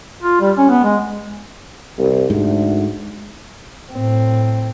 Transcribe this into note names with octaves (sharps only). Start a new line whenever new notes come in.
F4
G3
C#4
B3
G#3
C2
D2 G#2
A2 C4